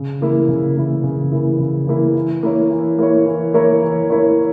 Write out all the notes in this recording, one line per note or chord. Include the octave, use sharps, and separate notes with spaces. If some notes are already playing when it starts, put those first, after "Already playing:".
Already playing: C#3
E3 A#3 E4
C#3
E3 A#3 E4
C#3
E3 A#3 E4
C#3
E3 A#3 E4
E3
A#3 E4 A#4 C#5
E3
A#3 E4 A#4 C#5
E3
A#3 E4 A#4 C#5
E3
A#3 E4 A#4 C#5